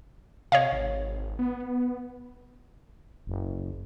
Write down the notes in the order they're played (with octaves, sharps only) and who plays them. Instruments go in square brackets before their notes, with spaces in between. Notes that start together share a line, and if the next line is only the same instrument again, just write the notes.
[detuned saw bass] C3 [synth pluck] C#5 D#5 F5
[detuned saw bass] G#1
B3
[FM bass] F#1